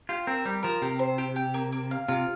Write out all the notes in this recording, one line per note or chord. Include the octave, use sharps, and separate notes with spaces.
F4 G4
C4 A#4
G3 G4
F3 A#4
C3 G4
C5
G4
G4
A#3
A#3
F5
C3 F4